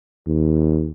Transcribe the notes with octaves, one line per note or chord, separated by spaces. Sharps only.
D#2